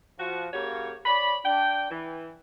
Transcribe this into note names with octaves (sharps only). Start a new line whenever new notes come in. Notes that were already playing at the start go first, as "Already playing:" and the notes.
F3 F#4
C#3 A#3 F#4 G4 C#5
C#5 D5 B5
D4 G5
E3